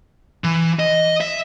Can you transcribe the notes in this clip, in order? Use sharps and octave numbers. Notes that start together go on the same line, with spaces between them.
E3
D#5
E5